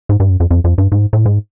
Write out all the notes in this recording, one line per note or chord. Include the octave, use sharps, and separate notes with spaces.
G#2
G2
F#2
F2
F2
F2
G2
G#2
A2
G#2